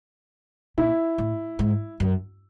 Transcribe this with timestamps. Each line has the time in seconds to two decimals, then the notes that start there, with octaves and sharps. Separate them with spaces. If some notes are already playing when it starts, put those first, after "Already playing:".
0.78 A#2 E4
1.18 A2
1.59 G#2
2.00 F#2